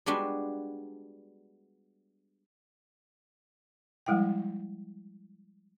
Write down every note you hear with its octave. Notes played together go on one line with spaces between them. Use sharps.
G3 G#3 B3 D4 F4 F#4
F3 G3 G#3 E4 E5 G5